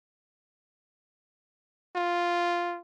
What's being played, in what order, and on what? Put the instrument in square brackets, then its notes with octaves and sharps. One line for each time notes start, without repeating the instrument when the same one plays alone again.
[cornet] F4